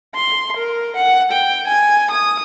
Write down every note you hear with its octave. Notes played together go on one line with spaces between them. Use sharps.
C6
A#4
F#5
G5
G#5
D#6